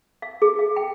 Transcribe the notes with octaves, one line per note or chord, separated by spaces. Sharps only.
F5
G#4
F5
G5